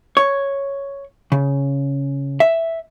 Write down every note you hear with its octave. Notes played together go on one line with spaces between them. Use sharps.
C#5
C#3
E5